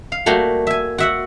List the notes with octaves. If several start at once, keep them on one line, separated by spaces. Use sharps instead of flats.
F5
G3 A3 A#3 F#4 G4
E5 G#5
F#4 E5 F#5